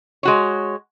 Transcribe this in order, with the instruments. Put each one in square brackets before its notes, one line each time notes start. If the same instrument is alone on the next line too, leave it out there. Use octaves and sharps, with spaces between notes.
[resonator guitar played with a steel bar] G#3 F#4 C#5